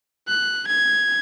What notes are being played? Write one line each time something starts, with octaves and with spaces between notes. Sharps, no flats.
F#6
G#6